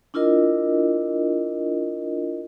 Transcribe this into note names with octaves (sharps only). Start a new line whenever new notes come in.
D4 E4 F4 A#4 D#5